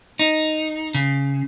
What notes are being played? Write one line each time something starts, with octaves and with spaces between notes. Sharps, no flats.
D#4
C#3